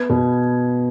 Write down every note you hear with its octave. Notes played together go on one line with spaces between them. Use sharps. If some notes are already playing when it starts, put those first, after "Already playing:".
Already playing: B3 G#6
B2